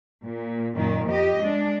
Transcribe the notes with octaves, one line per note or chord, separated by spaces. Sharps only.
A#2
F#2 A#2 D#3
F2 G4 D#5
G#3 D4